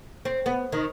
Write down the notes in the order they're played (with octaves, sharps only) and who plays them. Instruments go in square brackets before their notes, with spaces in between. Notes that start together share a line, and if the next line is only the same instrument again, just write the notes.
[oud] C4
B3
D#3